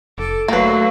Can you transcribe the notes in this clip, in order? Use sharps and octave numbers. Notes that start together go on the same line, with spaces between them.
F1 A4 D6
D3 F#3 A3 A#3 B4 F5